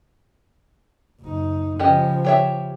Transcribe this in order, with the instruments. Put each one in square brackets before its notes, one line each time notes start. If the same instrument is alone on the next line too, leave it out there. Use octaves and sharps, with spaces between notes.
[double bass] F#1 D#4
[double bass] C#3 F3 [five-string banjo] C#4 G4 D#5
[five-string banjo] G4 C#5 E5